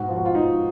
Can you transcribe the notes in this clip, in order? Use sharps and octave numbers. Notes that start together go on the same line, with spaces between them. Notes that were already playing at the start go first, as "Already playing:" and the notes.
Already playing: G#2 B2 F#4
F3 F4
F#4
F4
G#2 D#4